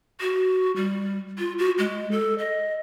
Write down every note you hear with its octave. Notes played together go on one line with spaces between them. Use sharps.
F#4
G3
F4
F#4
G#3
A4
D#5